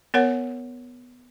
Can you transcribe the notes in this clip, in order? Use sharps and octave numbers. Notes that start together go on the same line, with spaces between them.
B3 A#4 C#5 F#5